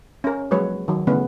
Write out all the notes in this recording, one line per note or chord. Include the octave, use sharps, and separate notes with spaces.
C#4 A#4
F3 F#3 G#3 A#3 B4 C#5
D#3 F#3
C#3 E3 A3 B3 C#4 B4